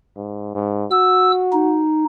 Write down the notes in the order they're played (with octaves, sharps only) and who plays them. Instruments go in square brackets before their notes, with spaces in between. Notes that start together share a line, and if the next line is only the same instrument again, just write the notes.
[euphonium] G#2
G#2
[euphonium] F#4 [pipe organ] E6
[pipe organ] D#4